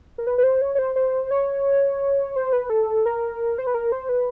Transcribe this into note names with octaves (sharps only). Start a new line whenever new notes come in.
A#4
B4
B4
C5
C#5
C#5
C5
C5
C#5
C5
B4
A4
A#4
C5
B4
A#4
C5
B4